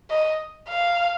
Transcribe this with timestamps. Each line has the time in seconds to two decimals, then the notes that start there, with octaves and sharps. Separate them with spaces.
0.10 D#5
0.69 F5